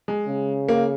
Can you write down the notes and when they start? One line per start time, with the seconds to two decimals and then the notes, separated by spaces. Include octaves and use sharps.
0.08 G#3
0.28 C#3
0.69 A#3